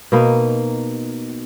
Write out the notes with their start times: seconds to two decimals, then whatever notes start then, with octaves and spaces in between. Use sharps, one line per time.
0.12 B2 A#3 D#4